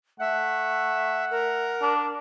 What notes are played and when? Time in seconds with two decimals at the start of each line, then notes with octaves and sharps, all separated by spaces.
0.20 A3 E5 F#5
1.31 A#4
1.82 D4